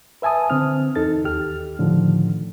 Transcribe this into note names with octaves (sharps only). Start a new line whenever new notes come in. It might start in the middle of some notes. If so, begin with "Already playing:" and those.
B4 E5 G#5 A5 D#6
D3 C4 F6
E2 D#4 A4 A6
D#2 G4 F6
A2 D3 D#3 F3